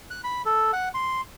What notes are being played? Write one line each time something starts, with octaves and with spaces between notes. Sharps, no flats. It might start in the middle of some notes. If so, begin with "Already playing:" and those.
F#6
B5
A4
F#5
C6